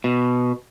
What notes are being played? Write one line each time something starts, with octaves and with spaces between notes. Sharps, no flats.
B2